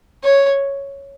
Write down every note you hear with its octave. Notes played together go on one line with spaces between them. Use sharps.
C#5